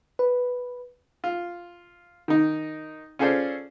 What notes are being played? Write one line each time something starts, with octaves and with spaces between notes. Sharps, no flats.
B4
F4
D#3 D#4
C#4 F4 G#4 A4 C5 D5